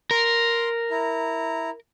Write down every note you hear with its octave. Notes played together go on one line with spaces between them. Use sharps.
A#4 C6
E4 A#5